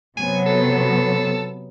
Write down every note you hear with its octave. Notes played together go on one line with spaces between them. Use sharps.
C3 F#3 B3 G#5
A4